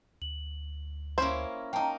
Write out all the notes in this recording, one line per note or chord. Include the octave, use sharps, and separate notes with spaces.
D2 F#7
A#3 C#4 E4 C5
A#3 D#4 G5 A5 A#5